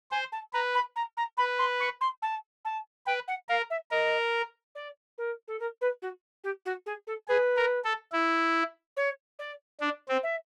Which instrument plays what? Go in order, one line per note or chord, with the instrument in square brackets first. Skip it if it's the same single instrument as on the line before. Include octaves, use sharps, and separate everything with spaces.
[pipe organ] C5 [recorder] G#5
[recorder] A5
[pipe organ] B4 [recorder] A#5
[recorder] B5
A#5
A#5
[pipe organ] B4 [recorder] B5
[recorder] C6
C#6
C6
A5
A5
[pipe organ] B4 [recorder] G5
[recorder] F#5
[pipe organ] A#4 [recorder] F5
[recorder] E5
[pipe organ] A#4 [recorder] D#5
[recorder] D5
A#4
A4
A#4
B4
F#4
G4
F#4
G#4
A4
[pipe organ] G#4 [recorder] B4
[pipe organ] A#4
A4
E4
[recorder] C#5
D5
[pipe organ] D4
C4
[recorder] E5